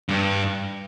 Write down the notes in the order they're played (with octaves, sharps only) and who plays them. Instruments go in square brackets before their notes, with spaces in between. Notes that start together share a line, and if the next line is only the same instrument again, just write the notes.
[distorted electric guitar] G2